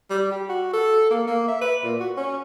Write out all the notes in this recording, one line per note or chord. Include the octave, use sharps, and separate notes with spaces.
G3
G4
F#4
A4
A#3
A#3
E5
B4
A#2
F#4
C#4